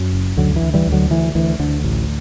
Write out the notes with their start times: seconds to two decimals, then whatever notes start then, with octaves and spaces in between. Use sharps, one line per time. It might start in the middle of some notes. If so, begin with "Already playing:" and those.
Already playing: F#2
0.13 F#1
0.37 D2 D3 F#3
0.56 E3
0.62 D2
0.74 E3 G3
0.87 D2
0.92 D3 F#3
1.10 D2 E3
1.35 D2 E3
1.59 D2 D3
1.84 A1